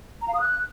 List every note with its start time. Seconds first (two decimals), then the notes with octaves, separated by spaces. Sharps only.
0.22 A#5
0.28 F5
0.34 D#6
0.41 F#6